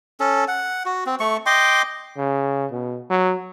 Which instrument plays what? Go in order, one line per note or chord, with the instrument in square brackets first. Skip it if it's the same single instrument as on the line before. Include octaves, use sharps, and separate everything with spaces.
[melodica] C#4 A4
F#5
F#4
C4
A3 C#6
D#5 G5 C6 D6
[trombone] C#3
B2
F#3